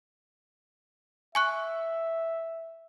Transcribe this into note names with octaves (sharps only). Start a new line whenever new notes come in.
E5 G#5 C#6 F#6